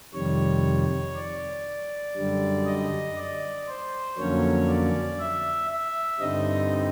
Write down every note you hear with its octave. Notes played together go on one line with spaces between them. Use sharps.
F2 C3 D#3 G3 C#5
D5
F#2 D3 G3
D#5
D5
C5
F2 D3 F#3 A#3 C#4 C#5
D5
E5
E5
G2 D3 G3 C4 D#4 D#5